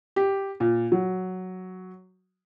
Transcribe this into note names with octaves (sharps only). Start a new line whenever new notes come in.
G4
A#2
F#3